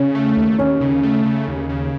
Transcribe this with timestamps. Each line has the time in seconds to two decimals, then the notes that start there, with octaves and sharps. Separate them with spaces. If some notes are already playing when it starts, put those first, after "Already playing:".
Already playing: C#3 C#4
0.15 A3
0.37 D#2
0.58 D#2 C#4
0.81 C#3
1.03 A3
1.25 C#3
1.47 D#2
1.69 C#3